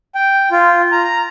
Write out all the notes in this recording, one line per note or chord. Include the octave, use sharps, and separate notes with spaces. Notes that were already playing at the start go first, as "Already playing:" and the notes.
G5
F4
A#5
A#5